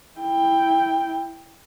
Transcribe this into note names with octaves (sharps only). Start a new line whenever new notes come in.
E4 G5